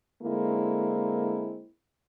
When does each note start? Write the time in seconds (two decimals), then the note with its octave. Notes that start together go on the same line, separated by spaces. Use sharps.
0.23 D3 G#3 A#3 C4 E4